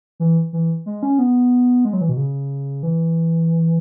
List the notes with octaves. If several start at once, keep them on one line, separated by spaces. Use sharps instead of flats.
E3
E3
G#3
C#4
B3
G#3
F#3
E3
B2
C#3
E3